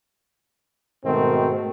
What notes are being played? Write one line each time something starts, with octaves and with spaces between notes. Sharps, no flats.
G#2 B2 D#3 A3 C4